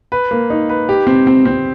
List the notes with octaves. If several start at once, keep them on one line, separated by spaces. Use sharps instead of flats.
B4
A#3
D#4
B4
G4
C4
C4
C4